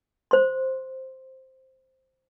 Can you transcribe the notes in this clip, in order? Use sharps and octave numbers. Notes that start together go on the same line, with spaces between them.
C5 C6